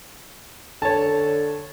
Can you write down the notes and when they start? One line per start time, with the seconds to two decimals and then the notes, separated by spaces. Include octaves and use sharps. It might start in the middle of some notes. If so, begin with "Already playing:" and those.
0.82 D3 C#5 A5